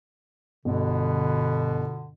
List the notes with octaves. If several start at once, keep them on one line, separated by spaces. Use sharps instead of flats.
G1 B2 D3